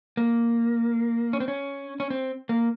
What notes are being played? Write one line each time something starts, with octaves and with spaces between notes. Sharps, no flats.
A#3
C#4
C4
C#4
C#4
C4
A#3